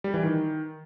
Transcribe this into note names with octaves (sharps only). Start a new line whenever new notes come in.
G3
E3
D#3